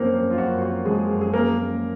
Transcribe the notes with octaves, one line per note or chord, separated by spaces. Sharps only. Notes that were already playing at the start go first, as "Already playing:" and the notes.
Already playing: F#2 F3 A#3 C4 C#4 A#4 C5 C#5
F#2
F4
F#2 F#4
C4 F#4
F3 G#3 G#4
F#2
G#4
A#3 C#4 A#4
A#3